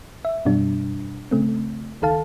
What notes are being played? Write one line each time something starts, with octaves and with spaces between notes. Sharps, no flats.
E5
F#2 B2 G3 D4
C#3 A3 C4
C#2 D#3 A4 F5 A5